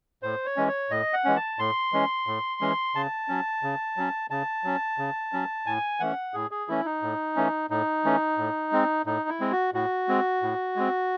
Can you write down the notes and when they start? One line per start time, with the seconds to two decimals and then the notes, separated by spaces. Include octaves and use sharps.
0.23 A2 C5
0.46 C#5
0.57 E3 G#3 C#4
0.68 C#5
0.90 A2 D#5
1.13 F#5
1.24 E3 G#3 C#4
1.36 A5
1.59 A2 C6
1.93 E3 G#3 C#4
2.27 A2
2.61 E3 G#3 C#4
2.95 C#3 A5
3.28 F#3 C#4
3.63 C#3
3.97 F#3 C#4
4.31 C#3 A5
4.64 F#3 C#4
4.98 C#3
5.33 F#3 C#4
5.66 A2 G#5
6.00 E3 A3 C#4 F#5
6.34 A2 G#4
6.51 G#4
6.68 E3 A3 C#4 E4
6.85 D#4
7.02 A2
7.36 E3 A3 C#4
7.70 A2 D#4
8.05 E3 A3 C#4
8.38 A2
8.72 G#3 C4
9.06 A2 D#4
9.29 E4
9.40 G#3 C4
9.52 F#4
9.74 A2 F#4
10.08 G#3 C4
10.42 A2
10.76 G#3 C4